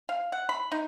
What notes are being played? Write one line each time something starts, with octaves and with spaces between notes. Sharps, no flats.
F5
F#5
B5
D#4